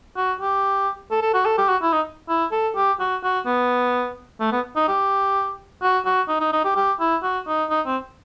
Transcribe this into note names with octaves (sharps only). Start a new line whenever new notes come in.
F#4
G4
A4
A4
F#4
A4
G4
F#4
E4
D#4
E4
A4
G4
F#4
F#4
B3
A3
B3
D#4
G4
F#4
F#4
D#4
D#4
D#4
G4
G4
E4
F#4
D#4
D#4
C4